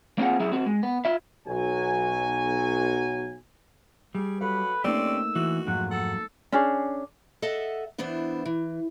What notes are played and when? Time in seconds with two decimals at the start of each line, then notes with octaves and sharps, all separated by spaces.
0.18 A#3 C4 F4 G#4 F#5
0.40 F#3 E4 G#4 E5
0.52 C4 F#4
0.66 G#3
0.83 B3
1.05 F4 E5
1.47 B1 F#3 G#5
4.15 G3 G#4
4.41 F#3 A4 B4 F5
4.84 A3 A#3 C4 C#4 D#4 G4 D5 E6
5.35 E3 F#4
5.67 F2 G#2 F#3 F#5
5.91 A4 F#5
6.52 C#4 D4 G#4
7.42 A4 D#5 E5 F#5
7.98 E3 B3 D4 E4 C5
8.45 E3